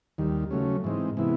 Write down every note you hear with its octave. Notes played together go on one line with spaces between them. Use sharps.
D#2 D#3 G3
C#3 F#3 A3 C#4
G#2 E3 G#3 C4 D#4
C3 E3 G#3 B3 E4